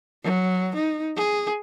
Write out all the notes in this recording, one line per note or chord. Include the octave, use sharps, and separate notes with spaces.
F#3
D#4
G#4